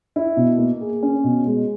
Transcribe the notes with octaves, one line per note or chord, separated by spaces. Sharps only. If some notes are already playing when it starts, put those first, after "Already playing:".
E4
B2
A#3
G#4
C#4
B2
G#3